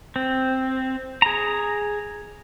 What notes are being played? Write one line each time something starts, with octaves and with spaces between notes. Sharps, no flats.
C4
G#4 A#5